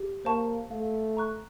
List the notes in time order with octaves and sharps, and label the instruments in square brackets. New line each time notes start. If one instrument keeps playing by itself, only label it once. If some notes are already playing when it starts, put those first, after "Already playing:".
Already playing: [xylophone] G4
[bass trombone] A#3 [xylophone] C5 F5 A5 C#6
[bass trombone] A3 [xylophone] F5
[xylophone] A#5 C#6 F#6